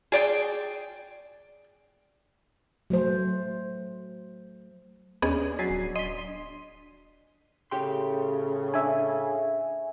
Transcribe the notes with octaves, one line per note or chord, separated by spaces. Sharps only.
G#4 D5 G5
F#3 A3 C5
D#2 B3 C#4 D4 G#4 D5 D#5
F#3 G#5 A6 B6 C7
D1
D#5 C6 B6
A2 C#3 G4 G5 C6
D4 E5 G#5